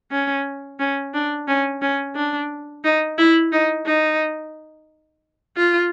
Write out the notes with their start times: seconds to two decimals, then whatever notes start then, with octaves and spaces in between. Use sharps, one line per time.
0.11 C#4
0.79 C#4
1.14 D4
1.48 C#4
1.82 C#4
2.16 D4
2.84 D#4
3.18 E4
3.52 D#4
3.86 D#4
5.57 F4